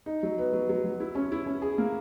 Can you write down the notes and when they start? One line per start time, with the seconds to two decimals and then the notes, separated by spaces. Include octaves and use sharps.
0.06 D#4
0.23 F#3
0.38 B3
0.53 F#3
0.69 F#3
0.84 F#3
1.00 E4
1.15 C#4
1.32 E4
1.46 C#4
1.62 G#4
1.78 A#3